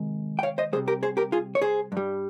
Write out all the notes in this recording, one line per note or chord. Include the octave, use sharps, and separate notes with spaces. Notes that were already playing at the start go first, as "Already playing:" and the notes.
Already playing: C3 D#3 G#3
G5
C#5 F5
C5 D#5
C3 D#3 G3 G#4 C5
G4 A#4
G#4 C5
G4 A#4
F4 G#4
C#5
G#4 C5
G2 G3